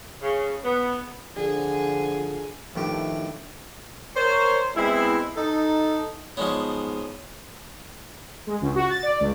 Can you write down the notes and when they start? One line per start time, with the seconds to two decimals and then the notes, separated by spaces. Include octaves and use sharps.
0.22 C#3
0.65 B3
1.36 D3 F3 G#4
2.76 A1 A2 D#3 F3 D4 E4 G4
4.15 A#4 C5 C#5
4.75 G#3 B3 C4 E4
5.36 D#4 A4
6.37 G#2 F3 G#3 B3 C#5 D#5
8.47 G#3
8.61 C#2
8.75 F#4
8.90 A6
9.03 D5
9.20 C#2